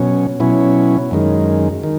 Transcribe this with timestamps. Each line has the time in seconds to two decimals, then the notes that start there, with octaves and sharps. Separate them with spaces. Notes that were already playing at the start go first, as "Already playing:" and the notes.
Already playing: B2 F#3 C#4
0.40 B2 F#3 C#4 E4
1.11 F#2 D#3 G#3
1.83 D#3